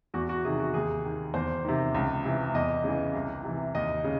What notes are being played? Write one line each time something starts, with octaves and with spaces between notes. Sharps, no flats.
E2 F#4
F#4
C3 D#3 G#4
F#4
D#2 G#4
D#3
E2 C5
C3 D#3
C#2
C3 E3
E2 D#5
C#3 E3
C2
C3 E3
D#2 D#5
C#3